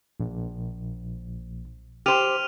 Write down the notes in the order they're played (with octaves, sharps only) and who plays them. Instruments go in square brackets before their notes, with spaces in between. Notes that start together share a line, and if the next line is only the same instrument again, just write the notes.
[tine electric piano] A#1
[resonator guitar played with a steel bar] G4 C5 [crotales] F6 D#7 F7